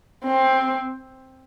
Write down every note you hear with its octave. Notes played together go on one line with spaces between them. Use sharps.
C4